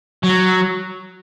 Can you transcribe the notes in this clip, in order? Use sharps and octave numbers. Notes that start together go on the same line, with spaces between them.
F#3